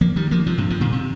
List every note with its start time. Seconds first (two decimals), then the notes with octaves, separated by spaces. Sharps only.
0.01 F3 A#3
0.16 D#3 G3
0.31 F3 A#3
0.46 C3 F3
0.58 G2 C3
0.70 C3 F3
0.81 A#2 D#3
0.92 C3